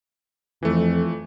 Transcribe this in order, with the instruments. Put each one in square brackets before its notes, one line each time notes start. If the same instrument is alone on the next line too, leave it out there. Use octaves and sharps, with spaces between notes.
[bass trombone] F2 [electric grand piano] E3 A3